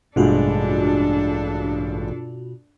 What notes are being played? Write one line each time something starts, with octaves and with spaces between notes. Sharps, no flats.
A1 G2 B2 G#3 D4 F4 F#4 A4